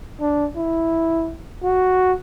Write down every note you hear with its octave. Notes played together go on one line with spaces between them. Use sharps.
D4
E4
F#4